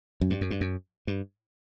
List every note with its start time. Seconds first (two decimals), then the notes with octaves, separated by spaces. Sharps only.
0.21 F#2
0.30 G2
0.41 F#2
0.50 G2
0.61 F#2
1.07 G2